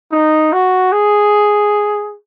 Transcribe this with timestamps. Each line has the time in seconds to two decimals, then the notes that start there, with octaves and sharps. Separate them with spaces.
0.12 D#4
0.53 F#4
0.92 G#4